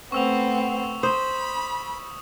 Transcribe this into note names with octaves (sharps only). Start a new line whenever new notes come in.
A3 B3 C4 C#6 E6 F7
C5 B5 D#6